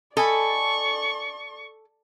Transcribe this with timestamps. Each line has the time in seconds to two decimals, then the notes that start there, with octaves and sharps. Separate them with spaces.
0.17 A4 D5 D#5 G#5 B5 C#6